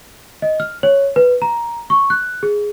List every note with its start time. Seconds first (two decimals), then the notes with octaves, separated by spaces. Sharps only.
0.42 D#5
0.60 F6
0.83 C#5
1.16 B4
1.42 A#5
1.90 C#6
2.10 F#6
2.43 G#4